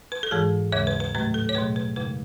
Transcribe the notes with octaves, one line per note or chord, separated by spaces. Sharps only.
B4
A4
G#2 E3 G#3 G#4
D#2 C#3 G#3 C#5
B4
B4
A2 F#3 A3 B4
A4
C#5
B2 F#3 A3 B4
B4
F#2 C#3 G#3 B4